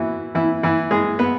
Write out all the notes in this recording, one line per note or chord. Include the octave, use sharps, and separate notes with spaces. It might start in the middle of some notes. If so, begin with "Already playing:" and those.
Already playing: E3 E4 F#4
E3 E4
E3 E4
G#3 G#4
B3 B4